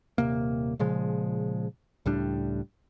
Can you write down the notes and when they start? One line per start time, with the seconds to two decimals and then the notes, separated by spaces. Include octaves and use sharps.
0.18 D#1 C3 A#3
0.79 A#2 C#3 F3 G#3
2.06 C#2 A2 G3 D4